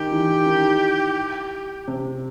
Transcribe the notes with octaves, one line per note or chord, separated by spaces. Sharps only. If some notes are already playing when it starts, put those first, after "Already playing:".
Already playing: D#3 G4
E3
D#3
D#3
C3